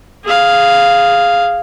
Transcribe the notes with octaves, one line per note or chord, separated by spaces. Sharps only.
G#4 F5